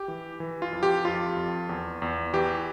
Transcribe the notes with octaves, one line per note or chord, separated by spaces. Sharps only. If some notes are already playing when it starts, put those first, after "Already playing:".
Already playing: G4
E3
E3
F4
F2
G4
F2 F4
F2
E2
E2
E3 G4